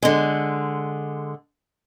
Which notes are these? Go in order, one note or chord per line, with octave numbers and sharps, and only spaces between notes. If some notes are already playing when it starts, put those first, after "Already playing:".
D3 G#3